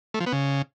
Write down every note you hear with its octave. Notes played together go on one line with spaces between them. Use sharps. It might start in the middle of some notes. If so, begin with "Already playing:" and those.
A3
F3
B3
C#3